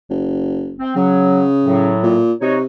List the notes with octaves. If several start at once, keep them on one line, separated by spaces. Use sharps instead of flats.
F#1
C4
C#3 F#3
A2 F#3
A#2
C3 D#4 F#4 C#5